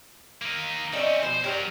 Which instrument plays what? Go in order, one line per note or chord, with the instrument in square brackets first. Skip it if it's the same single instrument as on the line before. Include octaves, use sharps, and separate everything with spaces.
[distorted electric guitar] A#3 D#4
[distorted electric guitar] C4 C#4 [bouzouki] D#4 D5 E5
[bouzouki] B2 F3 [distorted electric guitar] C5
[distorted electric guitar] F#3 A#4 [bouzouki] G4 C#5 D5